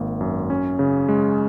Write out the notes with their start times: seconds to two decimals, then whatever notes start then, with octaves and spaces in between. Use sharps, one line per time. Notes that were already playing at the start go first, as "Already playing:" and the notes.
Already playing: G#1 A#3
0.21 F#2
0.50 C#4
0.79 C#3
1.08 G#3